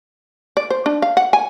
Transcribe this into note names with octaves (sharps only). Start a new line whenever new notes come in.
D5
C5
D4
F5
F#5
G#5